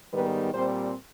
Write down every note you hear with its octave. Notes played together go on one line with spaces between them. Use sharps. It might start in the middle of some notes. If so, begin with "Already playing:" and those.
G#2 D#3 G3 B3 B4
A#2 G3 C4 C5